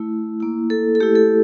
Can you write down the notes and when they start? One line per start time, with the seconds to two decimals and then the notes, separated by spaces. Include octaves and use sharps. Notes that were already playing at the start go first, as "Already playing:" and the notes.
Already playing: A3 E4
0.40 A#3 E4
0.70 A4
0.95 A4
1.00 A3 E4 G4
1.16 A4